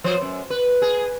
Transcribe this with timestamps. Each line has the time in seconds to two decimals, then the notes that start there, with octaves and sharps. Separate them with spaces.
0.04 F3 C5
0.21 F#2
0.50 B4
0.82 G#4